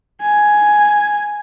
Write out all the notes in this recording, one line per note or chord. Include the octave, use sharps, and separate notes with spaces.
G#5